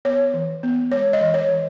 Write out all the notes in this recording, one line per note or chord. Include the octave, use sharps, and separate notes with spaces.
B3 C#5
E3
B3
G#3 C#5
D#5
E3
C#5
E3